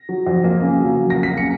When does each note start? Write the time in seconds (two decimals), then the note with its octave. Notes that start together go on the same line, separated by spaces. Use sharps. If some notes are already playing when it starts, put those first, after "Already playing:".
Already playing: A#6
0.09 F#3
0.27 F2
0.44 A#3
0.62 C#3
0.80 F#3
0.97 F2
1.10 A#3 A#6
1.23 B6
1.32 C#3
1.37 C#7